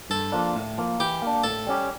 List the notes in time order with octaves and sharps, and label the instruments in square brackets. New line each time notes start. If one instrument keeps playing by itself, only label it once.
[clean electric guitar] G2 [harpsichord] A4
[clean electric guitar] F3 A#3 D4
A2
F3 A#3
[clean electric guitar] E3 [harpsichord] G4
[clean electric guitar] A#3 D4
[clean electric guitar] A2 [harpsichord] A4
[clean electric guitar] G3 C#4 G4